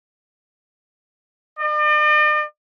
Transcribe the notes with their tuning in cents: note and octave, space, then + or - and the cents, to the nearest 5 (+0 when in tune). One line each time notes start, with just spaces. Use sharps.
D5 +45